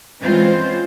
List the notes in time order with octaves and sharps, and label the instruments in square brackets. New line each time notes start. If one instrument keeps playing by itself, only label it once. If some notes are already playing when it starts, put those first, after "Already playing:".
[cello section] E3 G#3 C4 C#4 F4 C5